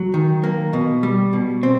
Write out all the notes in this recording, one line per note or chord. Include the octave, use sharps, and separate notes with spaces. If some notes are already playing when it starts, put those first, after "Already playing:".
Already playing: F#3
D#3
A#3
B2
G3
B2
C4